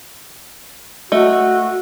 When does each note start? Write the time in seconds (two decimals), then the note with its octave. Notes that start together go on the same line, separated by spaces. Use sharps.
1.12 A3 F#4 D#5